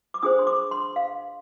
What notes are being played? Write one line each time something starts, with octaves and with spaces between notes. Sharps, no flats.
D6
D4 G#4 C5 D#6
C6
D6
C6
F5